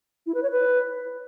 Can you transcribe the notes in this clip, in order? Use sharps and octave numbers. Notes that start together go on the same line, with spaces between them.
E4
B4
C#5
B4